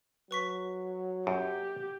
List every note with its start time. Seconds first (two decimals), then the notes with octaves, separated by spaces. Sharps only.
0.31 F#3 B4 C#6 B6
1.27 F#2 G4